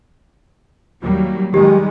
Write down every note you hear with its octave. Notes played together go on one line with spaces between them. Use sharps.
D#2 F#3 G3 A#3
D#3 G3 G#3 G4